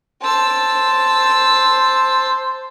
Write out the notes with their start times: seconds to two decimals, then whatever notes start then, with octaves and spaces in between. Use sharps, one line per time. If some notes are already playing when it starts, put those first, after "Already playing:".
0.23 C5 A5 E6